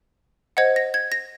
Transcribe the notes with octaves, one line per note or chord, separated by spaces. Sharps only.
C5 D#5 F#5 G#6
A#6
G#6
A#6